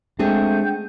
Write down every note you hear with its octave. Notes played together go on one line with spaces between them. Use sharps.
G#3 A3 C4 D4 G#4 F#5 G5 G6